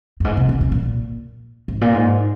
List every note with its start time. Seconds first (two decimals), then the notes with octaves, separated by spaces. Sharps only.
0.20 G2
0.24 G#2
0.37 C3
0.49 C3
0.61 C3
0.72 A#2
1.68 G#2
1.81 A#2
1.94 G#2